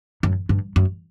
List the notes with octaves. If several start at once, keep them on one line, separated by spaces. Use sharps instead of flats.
F#2
G2
F#2